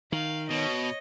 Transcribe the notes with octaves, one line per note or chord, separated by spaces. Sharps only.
D#3 F5
B2 C#5 D#5